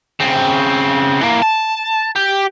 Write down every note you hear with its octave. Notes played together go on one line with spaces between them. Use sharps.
C#3 C4
E3 A#3
A5
G4